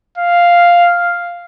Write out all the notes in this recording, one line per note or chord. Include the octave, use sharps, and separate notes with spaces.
F5